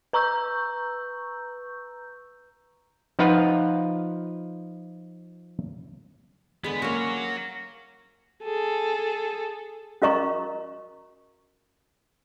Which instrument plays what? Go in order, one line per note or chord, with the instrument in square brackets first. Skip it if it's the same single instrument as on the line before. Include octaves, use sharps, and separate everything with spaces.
[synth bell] B4 A#5 C#6 E6 G6
[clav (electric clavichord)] F3 D#4 F4 B4 F5 F#5
[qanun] D3 G#3 [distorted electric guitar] B3
[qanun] A#3 C#4 [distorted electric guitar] F#4 C#5
[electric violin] G#4 A4
[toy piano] C#4 F#4 A#4 D#5 A#5 C#6